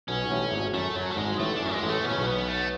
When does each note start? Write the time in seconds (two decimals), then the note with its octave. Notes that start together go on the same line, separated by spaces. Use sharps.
0.08 B1 B2 C#4
0.30 A1 A2
0.52 G#1 G#2
0.73 F#2 A3
0.96 F#2 F#3
1.11 A3
1.17 G#1 G#2 G#3
1.39 A1 A2 A3
1.55 D4
1.60 F#2
1.72 G#3
1.83 A1 A2
1.89 A3
2.04 B2 C#4
2.12 C#3
2.18 B1 B2
2.26 B3
2.48 A3